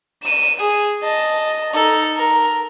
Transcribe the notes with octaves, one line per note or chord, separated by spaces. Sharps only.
D#7 E7
G#4
D#5 A5
D#4 A4
A#4